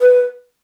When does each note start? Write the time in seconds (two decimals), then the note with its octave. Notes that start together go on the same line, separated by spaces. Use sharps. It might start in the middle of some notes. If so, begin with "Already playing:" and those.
0.01 B4